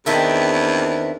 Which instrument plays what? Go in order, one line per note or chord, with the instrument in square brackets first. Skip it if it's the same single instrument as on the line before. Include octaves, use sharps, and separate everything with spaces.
[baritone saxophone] E2 [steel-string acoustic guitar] D#3 C4 D4 [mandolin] G4 E5